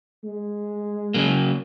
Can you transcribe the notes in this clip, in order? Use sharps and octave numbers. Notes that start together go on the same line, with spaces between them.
G#3
C#3 F#3 A#3